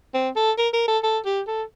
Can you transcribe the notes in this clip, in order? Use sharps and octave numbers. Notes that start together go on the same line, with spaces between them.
C4
A4
A#4
A#4
A4
A4
G4
A4